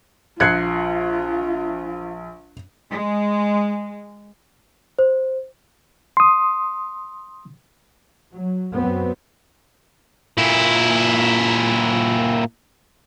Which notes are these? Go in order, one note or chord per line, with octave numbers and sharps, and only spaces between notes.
A#1 F4 F#6 G#6 C7 C#7
G#3
C5
C6 D#6
F#3
F#2 F#3 B3 C4
A#2 E4